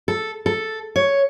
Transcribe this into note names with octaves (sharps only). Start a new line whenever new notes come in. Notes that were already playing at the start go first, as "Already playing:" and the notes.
A4
A4
C#5